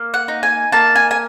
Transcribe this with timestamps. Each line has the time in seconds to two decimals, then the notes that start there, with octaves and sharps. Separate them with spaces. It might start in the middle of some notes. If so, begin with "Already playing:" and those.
Already playing: A#3
0.14 F#5
0.28 D#4
0.43 G#5
0.72 A#3 A5
0.96 G#5
1.11 G#5